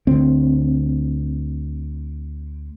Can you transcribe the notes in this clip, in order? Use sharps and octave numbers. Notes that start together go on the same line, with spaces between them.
D2 C4